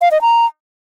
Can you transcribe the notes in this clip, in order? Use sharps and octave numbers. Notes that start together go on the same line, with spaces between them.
F5
D#5
A#5